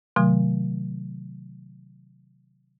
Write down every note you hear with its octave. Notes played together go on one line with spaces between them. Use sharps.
C3 D#3 F#3 A3